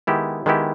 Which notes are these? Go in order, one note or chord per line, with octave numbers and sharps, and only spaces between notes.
D#3 G#3 B3 E4 G4
D#3 G#3 B3 E4 G4